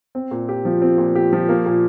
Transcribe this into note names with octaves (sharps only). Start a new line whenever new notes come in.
C4
A#2
G4
F3
C4
A#2
G4
F3
A#3
A#2